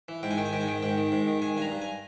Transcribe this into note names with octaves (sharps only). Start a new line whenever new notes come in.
E3
G#2 G5
G#5
D#3 G5
G#5
G#2 G5
G#5
D#3 G5
G#2 G5
D#3
G#2
D#3
D#3 G#5
G2 G#5
A#5
G2
G#5